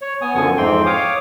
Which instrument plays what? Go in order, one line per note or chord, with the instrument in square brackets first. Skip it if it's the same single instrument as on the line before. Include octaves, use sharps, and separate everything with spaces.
[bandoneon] C#5
B3 G#5 D#6
F#2 D3 F3 B3 G#5 C#6
F2 G#2 E3 C4 G5 C6
C#5 F5 D6 D#6